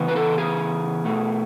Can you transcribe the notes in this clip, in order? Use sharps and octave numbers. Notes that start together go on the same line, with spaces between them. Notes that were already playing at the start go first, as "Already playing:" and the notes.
Already playing: C#3 E3 B3
B4
A4
G#4
B2 A3